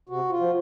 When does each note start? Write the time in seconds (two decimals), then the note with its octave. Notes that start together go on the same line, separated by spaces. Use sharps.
0.09 C3 F#4
0.30 F4
0.40 F3